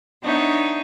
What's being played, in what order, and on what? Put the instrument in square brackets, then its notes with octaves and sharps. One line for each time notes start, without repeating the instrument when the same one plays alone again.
[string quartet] B3 D4 D#4 C#5 E5